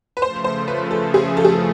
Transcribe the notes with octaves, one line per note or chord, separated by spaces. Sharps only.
B4
C#3 F3 A3 C5
C5
B4
A4
G#4
A4
G#4
A4